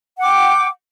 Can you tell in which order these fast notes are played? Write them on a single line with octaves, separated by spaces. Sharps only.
F#5 D6 G5